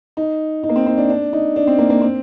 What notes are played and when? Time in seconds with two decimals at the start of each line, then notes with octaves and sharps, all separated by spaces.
0.17 D#4
0.63 D#4
0.69 A#3
0.76 C4
0.86 C4
0.98 D4
1.10 D4
1.33 D#4
1.56 D4
1.67 C4
1.78 A#3
1.90 A#3
2.01 C4